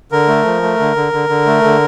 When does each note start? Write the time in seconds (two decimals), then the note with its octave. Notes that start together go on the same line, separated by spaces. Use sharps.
0.12 D3 A#4
0.28 A3
0.45 F3
0.63 A3
0.80 D3
0.96 D3
1.13 D3
1.29 D3
1.47 A3
1.64 D3